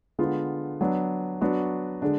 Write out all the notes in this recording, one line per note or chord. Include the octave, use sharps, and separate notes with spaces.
D3 G#3 B3 F4
F#3 B3 D4
F#3 B3 D4 F#4
D3 G#3 D4